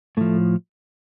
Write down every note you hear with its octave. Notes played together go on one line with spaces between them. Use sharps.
A2 F3 A3